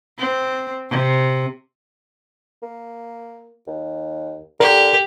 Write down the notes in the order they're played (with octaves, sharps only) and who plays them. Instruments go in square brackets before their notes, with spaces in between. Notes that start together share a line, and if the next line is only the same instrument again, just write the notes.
[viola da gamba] C4
C3
[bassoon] A#3
D#2
[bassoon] D3 [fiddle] G4 [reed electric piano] A#4